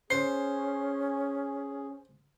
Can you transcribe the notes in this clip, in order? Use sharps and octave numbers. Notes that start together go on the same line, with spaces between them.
C#4 G#4 C5 C7